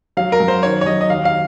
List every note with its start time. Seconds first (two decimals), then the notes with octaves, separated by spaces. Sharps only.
0.17 F#3 F5
0.32 A#4
0.40 F#2
0.48 C5
0.63 D#3 C#5
0.81 C#5
0.86 F#3 D#5
1.01 D#5
1.10 D#2 F5
1.25 F5